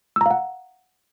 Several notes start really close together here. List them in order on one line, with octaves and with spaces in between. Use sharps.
E6 A#5 F5 F#5